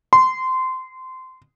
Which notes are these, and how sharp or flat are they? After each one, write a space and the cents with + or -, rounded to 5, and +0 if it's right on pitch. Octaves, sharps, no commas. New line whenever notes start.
C6 -20